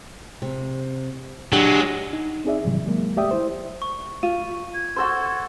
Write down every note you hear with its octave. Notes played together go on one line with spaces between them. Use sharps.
C3
F#3 G#3 D4 G4 F#5
D#4
C4 D#4 G#4 D5 E5
G#2 C3 D#3 E3 F#3 G3
F#3 G#3 A#3
A3 G4 D5 E5 G5 D#6
E4 C5
C#6
F4 D#7
G#6
F#4 A4 C5